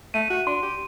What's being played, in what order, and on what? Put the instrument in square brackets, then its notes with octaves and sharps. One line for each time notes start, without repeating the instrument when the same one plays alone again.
[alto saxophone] A3 [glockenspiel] D#7
[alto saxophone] F#4
[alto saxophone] D4 [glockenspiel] C6
[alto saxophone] G4